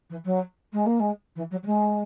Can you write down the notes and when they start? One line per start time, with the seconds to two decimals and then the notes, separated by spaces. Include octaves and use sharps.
0.09 E3
0.25 F#3
0.72 G#3
0.86 A#3
0.99 G#3
1.35 E3
1.51 F#3
1.63 F#3
1.66 G#3